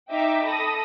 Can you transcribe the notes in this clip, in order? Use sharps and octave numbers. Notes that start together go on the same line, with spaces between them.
D#4 E5 G5 D6
A4 B5 D#6 A#6